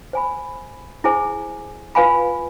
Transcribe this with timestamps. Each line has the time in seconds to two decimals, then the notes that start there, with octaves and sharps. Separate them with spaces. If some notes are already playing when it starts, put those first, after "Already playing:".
0.13 C5 G#5 B5
1.04 E4 G#4 C5 G#5
1.95 F4 B4 F5 G#5 B5